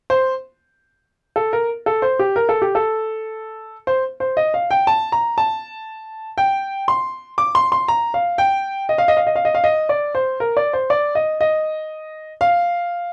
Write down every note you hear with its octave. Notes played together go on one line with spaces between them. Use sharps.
C5
A4
A#4
A4
C5
G4
A#4
A4
G4
A4
C5
C5
D#5
F5
G5
A5
A#5
A5
G5
C6
D6
C6
C6
A#5
F5
G5
D#5
F5
D#5
F5
D#5
F5
D#5
F5
D#5
D5
C5
A#4
D5
C5
D5
D#5
D#5
F5